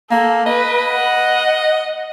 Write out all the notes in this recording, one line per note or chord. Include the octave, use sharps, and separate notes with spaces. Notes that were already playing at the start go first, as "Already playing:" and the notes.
A#3 A4
B4 D#5
F#5